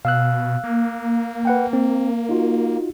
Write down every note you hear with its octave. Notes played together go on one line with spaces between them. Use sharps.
B2 F5 E6 F#6
A#3
B4 F#5 G5
C4
D#4 F4 F#4